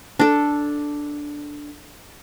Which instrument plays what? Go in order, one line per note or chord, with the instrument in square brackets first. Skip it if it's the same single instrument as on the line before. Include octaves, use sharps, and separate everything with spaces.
[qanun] D4 A4